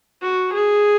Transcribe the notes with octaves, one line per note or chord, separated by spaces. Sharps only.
F#4
G#4